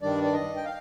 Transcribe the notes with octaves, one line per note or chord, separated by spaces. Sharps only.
G2 D#3 G3 D4 D5
D5
D#5
G5
F5